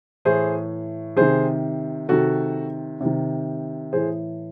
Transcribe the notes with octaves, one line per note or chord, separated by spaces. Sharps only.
A2 E3 G#4 C5
C3 D#3 G#4 C5
C3 D#3 F#4 A4
C3 D#3
A2 E3 G#4 C5